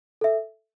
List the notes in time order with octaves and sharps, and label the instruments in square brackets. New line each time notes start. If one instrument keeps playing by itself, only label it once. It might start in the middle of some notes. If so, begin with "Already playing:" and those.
[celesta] A4 E5